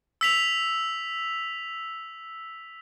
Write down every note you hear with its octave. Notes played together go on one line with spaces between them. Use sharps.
E6 B6 F7